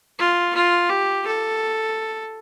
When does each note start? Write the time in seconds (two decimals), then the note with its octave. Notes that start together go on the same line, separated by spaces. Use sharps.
0.19 F4
0.55 F4
0.90 G4
1.26 A4